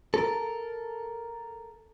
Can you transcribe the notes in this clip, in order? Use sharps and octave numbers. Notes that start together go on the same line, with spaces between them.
A4 A#4